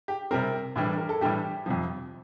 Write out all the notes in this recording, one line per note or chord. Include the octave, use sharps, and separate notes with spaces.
G4
C3 G3 C4 A#4
A2 E3 G3 D4
A#4
A4
A2 E3 G3 D4 G4
F2 C3 F3